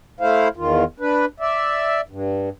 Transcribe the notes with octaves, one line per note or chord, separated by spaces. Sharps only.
A3 E4 C5 F5
E2 D#3 F4
D4 B4
D5 E5
G2